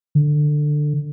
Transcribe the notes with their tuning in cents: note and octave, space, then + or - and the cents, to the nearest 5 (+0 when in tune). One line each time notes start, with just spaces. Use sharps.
D3 +15